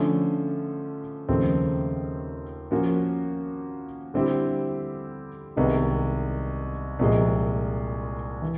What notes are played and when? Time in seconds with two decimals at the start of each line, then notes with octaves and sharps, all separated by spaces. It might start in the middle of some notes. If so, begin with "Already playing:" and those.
Already playing: D3 F3 A3 C#4
1.28 D#2 C#3 F3 A3 C4
2.71 F3 A#3 C#4 F#4
4.14 D3 G3 C4 E4 G4
5.56 C2 C3 D#3 G#3 B3
6.99 C2 A#2 F3 G#3
8.42 E3